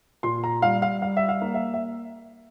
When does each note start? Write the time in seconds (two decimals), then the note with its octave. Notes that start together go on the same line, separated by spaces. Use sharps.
0.23 A#2 C6
0.44 A#5
0.62 G3 F5
0.82 F5
1.02 G3 F5
1.17 E5
1.29 F5
1.42 A#3
1.54 E5
1.74 E5